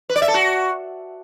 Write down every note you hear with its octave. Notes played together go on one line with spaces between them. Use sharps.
B4
D5
E5
A4
F#4